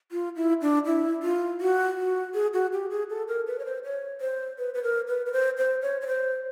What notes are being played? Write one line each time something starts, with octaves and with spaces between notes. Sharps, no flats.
F4
E4
D4
E4
F4
F#4
F#4
G#4
F#4
G4
G#4
A4
A#4
B4
C#5
C5
C#5
C5
B4
B4
A#4
B4
B4
C5
C5
C#5
C#5
C5